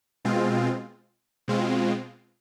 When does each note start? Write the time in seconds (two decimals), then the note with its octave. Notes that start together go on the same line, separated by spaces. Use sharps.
0.25 B2 G#3 C4 F4
1.48 B2 G#3 C4 F4